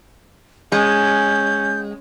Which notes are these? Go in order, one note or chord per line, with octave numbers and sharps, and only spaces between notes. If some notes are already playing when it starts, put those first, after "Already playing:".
G#3 C#4 G6